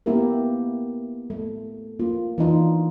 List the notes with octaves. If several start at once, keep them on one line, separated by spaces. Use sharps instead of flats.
A#3 B3 E4 G4 A#4
A3
A#3 F4
E3 D4 D#4 F4